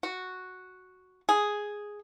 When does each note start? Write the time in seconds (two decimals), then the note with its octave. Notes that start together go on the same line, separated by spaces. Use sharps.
0.03 F#4
1.29 G#4